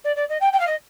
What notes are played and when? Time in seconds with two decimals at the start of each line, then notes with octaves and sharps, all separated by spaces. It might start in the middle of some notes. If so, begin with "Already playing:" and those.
0.04 D5
0.16 D5
0.29 D#5
0.40 G5
0.53 G5
0.59 F5
0.67 D#5